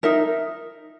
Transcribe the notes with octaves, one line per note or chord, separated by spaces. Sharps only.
D#4 A#4 E5